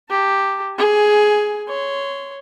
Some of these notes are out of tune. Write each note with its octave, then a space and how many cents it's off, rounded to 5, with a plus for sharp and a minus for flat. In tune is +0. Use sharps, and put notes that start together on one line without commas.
G4 +0 A5 +35
G#4 +15 G#5 +0
C#5 +0 C6 -15